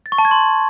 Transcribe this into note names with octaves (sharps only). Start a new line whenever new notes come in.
A6
C#6
A5
G#6
C6